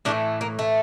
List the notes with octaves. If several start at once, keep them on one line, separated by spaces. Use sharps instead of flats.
A2 E3 A3 D4
A#3
A3